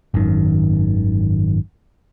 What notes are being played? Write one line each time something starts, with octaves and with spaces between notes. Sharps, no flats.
G#1 F#2 D#3